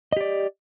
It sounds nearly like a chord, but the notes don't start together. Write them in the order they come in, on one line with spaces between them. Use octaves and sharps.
D#5 G4 D5